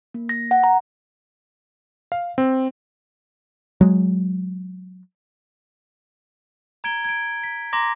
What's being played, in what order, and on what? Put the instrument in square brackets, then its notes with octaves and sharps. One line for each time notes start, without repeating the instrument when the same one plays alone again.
[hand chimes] A#3
A#6
F#5
A#5
[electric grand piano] F5
C4
[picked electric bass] F#3 G#3
[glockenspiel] A#5 G#6 D7 G7
G#6 D7
B6
A#5 C6 D6 A#6